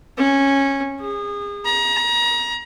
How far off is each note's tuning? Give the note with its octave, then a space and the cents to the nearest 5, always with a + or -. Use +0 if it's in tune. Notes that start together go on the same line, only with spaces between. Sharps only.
C#4 -10
G#4 -30
A#5 +30